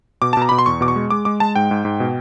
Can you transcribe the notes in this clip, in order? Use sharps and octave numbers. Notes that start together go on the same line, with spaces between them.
B2 D6
A5
B2 A#5
B2 B5
C6
E2 C#6
B2 D6
C#6
G#3
G#3 D6
G#3 D6
G#3 A5
G#2 G5
G#2
G#2
B2